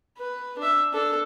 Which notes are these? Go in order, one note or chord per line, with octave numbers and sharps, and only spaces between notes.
B4
D4 E5
D4 A4